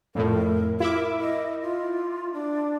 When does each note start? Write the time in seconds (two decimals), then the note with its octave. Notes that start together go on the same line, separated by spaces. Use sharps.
0.15 F2 A2 A#4
0.80 E4 A#4 E5 D6
1.20 D#5
1.62 F4
2.33 D4